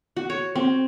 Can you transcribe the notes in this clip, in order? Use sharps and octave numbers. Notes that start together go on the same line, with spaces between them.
F#4
C#5
C4